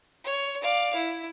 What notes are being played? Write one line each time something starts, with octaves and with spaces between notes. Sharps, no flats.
C#5
D5 F5
E4